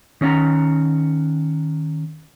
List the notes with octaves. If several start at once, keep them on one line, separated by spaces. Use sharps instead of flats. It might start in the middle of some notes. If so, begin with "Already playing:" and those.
D#3 C#4 D#5 F#5 A#5